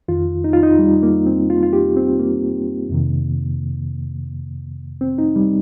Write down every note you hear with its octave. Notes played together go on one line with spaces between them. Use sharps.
F2 D#3 F4
D#4
F4
D#4
G3
A#3
C4
F4
F4
G4
C4
A#3
F2 C3 D#3
C4
D#4
G3